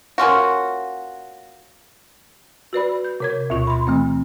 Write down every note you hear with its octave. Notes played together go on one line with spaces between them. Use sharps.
A#3 C#4 F4 F#4
F#4 B4 D5 B5
G6
C3 C#5 G#6
D2 B2 F4 C#6
B5 C6
E3 A3 C4